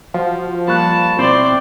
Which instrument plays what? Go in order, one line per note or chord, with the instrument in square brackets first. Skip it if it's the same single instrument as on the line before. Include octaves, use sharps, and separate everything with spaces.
[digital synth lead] F3 [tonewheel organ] F#4 C5
[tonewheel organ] G3 A#3 F4 [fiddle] A5 [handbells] B5 C#6 F#6
[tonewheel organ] B2 E4 [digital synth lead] C4 [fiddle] D5 C6